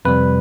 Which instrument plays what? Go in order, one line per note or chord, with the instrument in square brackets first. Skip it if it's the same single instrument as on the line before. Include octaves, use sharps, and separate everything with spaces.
[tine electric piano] F2 C3 G3 B4